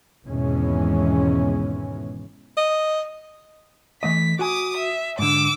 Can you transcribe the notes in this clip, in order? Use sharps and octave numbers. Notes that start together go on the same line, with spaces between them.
G#1 E2 B2 E3 G#3 C#4
D#5
E3 A3 D#5 B6
F#4 G#5 D6 D#6
E5
G#2 D3 D6 E6